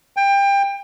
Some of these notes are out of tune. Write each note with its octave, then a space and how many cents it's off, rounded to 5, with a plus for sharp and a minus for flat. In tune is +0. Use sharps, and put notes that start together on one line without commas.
G5 +25